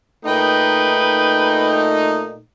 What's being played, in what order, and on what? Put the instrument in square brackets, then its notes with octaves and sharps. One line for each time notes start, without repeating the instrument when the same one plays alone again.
[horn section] A#2 A3 D#4 [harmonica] B4 G5